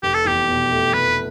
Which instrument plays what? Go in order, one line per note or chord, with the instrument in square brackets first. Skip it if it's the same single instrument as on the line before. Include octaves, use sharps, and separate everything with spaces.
[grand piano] F1 [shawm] G4
[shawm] A4
[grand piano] E2 [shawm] G4
[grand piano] B2
A3
[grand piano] F1 [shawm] B4